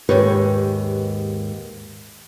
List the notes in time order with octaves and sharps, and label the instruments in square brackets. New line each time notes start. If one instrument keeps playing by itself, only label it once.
[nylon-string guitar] D#2 G#2 G4 B4 C#5